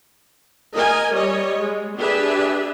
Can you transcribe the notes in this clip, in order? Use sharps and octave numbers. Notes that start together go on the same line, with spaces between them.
A#4 D#5 G#5
G3 C#5 D#5
G#3
D4 G4 G#4 B4 E5